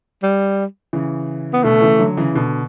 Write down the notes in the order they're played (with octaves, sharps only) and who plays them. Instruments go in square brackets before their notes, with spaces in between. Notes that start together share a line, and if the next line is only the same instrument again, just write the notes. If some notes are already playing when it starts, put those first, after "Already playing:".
[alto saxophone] G3
[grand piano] C#3 E3
[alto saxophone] B3
[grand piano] B2 D3 [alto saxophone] A3
[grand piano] C#3 E3
D3 F#3
C#3 E3
B2 D3